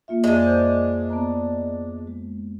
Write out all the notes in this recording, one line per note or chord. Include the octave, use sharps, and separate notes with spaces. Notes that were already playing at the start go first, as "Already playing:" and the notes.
A#3 F4 E5
F2 G#3 D4
A#4 C5 G6
B3 A5 A#5
G#3